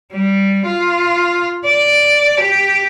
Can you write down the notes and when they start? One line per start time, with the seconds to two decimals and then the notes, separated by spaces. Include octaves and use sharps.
0.13 G3
0.66 F4
1.65 D5
2.40 G4